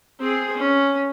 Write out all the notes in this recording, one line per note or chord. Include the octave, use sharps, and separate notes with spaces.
C4 G#4
C#4